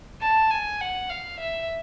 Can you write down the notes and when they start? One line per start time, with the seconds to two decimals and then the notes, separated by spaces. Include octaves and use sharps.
0.21 A5
0.50 G#5
0.81 F#5
1.10 F5
1.39 E5